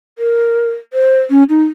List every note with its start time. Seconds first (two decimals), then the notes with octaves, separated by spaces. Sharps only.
0.18 A#4
0.93 C5
1.30 C#4
1.49 D#4